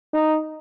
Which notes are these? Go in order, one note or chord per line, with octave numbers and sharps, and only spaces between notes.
D#4